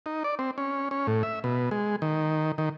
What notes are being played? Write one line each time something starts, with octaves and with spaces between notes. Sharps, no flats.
D#4
D5
C4
C#4
C#4
A2
E5
B2
G#3
D#3
D#3